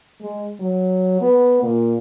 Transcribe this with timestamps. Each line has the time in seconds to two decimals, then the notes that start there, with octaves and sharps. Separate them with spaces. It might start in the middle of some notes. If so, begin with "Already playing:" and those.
0.21 G#3
0.59 F#3
1.21 B3
1.62 A#2